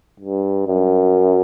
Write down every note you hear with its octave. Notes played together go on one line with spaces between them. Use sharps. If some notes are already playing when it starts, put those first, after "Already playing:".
G2
F#2